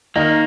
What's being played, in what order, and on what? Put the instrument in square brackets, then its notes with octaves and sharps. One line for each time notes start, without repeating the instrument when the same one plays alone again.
[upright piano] D#3 D#4 [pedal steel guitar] A#3